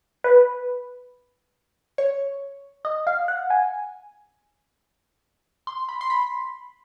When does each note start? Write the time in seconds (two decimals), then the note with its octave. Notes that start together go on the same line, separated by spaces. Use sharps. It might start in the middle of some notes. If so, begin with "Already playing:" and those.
0.24 B4
1.98 C#5
2.85 D#5
3.07 F5
3.28 F#5
3.50 G#5
5.67 C6
5.89 B5
6.01 C6
6.10 B5